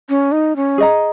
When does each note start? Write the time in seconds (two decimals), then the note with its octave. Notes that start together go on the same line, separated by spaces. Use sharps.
0.09 C#4
0.32 D#4
0.56 C#4
0.78 G#4 D#5 A#5